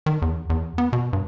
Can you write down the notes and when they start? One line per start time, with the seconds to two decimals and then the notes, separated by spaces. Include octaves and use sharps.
0.06 D#3
0.22 E2
0.50 E2
0.78 B3
0.93 B2
1.13 G2